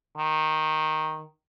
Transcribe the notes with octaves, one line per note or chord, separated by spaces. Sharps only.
D#3